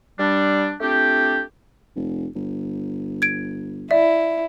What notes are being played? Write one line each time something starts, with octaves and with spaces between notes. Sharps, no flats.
G3 D4
A3 C4 D4 F4 G4
F1
G1
G#6 D7
E4 D5 E5